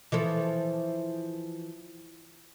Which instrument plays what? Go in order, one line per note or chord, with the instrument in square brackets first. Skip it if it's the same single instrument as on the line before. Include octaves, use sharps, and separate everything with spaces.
[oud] E3 F3 A4